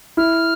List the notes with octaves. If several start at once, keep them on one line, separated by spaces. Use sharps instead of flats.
E4 F6